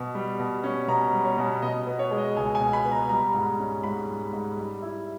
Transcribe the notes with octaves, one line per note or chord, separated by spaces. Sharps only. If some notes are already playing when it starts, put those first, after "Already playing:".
Already playing: B2
G3
B2
C#4
B2 A#5
G3
C#5
B2
B2 D#5
B3
C#5
G#3
D#5
C#2 G#5
G#5
B2
B5
B3
A#5
G3 A#5
G#2
C#4
G#2 B5
G3
G#2
G3
E4